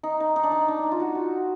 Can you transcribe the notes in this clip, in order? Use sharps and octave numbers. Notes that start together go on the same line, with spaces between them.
D#4
D#4
D#4
D4
D#4
D4
D4 D#4
F4
F#4
F#4